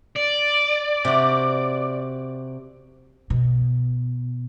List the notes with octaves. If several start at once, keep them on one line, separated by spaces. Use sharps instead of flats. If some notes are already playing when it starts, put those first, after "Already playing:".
D5
C3 F#4
B2